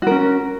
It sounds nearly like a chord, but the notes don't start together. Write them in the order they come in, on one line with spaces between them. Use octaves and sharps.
F#4 A#4 C#4